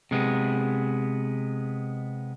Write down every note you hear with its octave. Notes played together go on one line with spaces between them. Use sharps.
C3 G#3 B3